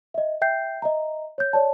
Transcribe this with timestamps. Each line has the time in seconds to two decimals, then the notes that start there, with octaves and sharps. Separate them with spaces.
0.14 D#5 E5
0.41 E5 G5 G6 C7
0.82 D#5 E5 A#5
1.38 C#5 G6
1.53 C#5 D5 A5